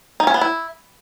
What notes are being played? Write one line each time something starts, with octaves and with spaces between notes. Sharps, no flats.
D#4
C#4
B3
E4